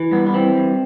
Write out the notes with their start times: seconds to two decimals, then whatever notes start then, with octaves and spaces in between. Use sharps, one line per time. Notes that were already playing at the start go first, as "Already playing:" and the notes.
Already playing: E3
0.11 G2 B3
0.26 B3
0.34 E3 C4
0.57 G2